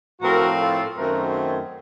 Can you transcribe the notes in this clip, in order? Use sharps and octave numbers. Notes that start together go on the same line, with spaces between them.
A2 F3 C4 F#4 A#4
F4 A4
F#2 D#3 A3 C4 F#4 A#4